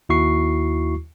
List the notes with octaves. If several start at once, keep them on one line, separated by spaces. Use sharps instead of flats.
D#2 E4 F#4 C#6 C7